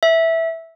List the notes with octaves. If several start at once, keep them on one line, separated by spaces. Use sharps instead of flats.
E5